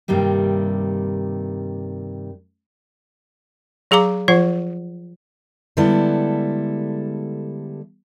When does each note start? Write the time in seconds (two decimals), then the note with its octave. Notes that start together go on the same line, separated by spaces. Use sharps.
0.08 G2 C3 D#3 G3 A#3
3.91 F#3 G#4 F5 A#5 D6
4.28 F3 F4 C5 F#5
5.77 D3 G3 G#3 B3 E4 A4